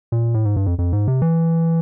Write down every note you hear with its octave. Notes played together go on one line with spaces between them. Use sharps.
A#2
A2
G#2
G2
F2
F2
G#2
C3
E3